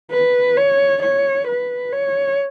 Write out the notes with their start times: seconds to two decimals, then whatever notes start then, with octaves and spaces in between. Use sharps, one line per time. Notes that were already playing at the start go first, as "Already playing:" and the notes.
0.11 B4
0.57 C#5
1.02 C#5
1.47 B4
1.92 C#5